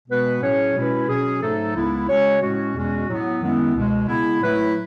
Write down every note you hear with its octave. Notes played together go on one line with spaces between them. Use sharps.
B2 G#3 B3 F#4 B4
A2 F#3 C#4 G#4 C#5
B2 G#3 C#4 E4 B4
B2 F#3 C#4 G#4
G#2 F#3 A3 D#4 A4
C#2 C#3 G#3 B3 E4
C#3 G#3 C#4 F#4 C#5
A2 G#3 C#4 F#4
E2 B2 G#3 C#4 F#4
A2 F#3 B3
F#2 D#3 G#3 B3 E4
C#2 B2 G#3
C#3 G#3 B3 E4
A2 F#3 A3 E4 B4